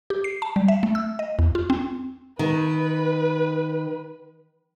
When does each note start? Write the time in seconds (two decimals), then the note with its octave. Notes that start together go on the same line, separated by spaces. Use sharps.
0.10 G4
0.24 C7
0.42 A5
0.56 G3
0.68 E5
0.83 A3
0.95 E6
1.19 D#5
1.39 E2
1.55 F4
1.70 C4
2.39 D#3 B4